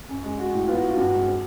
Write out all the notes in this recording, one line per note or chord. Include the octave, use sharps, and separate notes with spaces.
F#2
G#3
G#3 F#4
A2
B3 F4
F#4
B3 F4
G2 F#4
G#3
C4